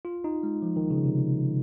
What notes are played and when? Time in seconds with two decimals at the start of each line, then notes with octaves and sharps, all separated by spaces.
0.05 F4
0.24 D#4
0.43 G#3
0.62 F3
0.76 D#3
0.90 C#3
1.05 C3